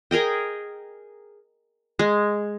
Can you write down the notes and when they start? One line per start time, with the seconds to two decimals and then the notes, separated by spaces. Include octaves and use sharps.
0.11 G#4 A#4 D#5 G5
1.99 G#3